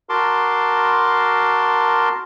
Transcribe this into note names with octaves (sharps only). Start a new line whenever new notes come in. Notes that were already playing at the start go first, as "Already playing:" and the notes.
F#4 A#4 A5 C6 D6